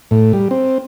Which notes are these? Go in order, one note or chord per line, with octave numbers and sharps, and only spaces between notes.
A2
G3
C4